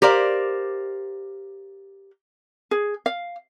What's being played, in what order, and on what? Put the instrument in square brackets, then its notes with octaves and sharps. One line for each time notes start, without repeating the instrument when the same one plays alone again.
[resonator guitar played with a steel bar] G4 A#4 C5 D5 F5
[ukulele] G#4
F5